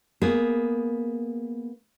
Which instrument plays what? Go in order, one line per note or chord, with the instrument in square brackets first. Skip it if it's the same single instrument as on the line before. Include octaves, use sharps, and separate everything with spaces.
[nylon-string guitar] A#3 B3 G#4